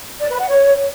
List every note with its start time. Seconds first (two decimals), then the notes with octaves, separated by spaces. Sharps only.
0.20 D5
0.30 B4
0.39 F#5
0.49 C#5